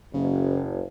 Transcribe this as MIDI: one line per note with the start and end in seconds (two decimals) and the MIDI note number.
0.13 0.83 30
0.13 0.65 49